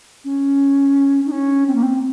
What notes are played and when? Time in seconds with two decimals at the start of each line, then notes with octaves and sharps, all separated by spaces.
0.24 C#4
1.26 D#4
1.32 C#4
1.67 C4
1.75 A#3
1.83 C4